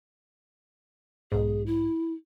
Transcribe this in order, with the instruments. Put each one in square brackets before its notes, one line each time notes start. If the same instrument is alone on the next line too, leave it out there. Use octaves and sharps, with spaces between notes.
[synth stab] B1 G#2 [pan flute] G#4
[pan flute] E4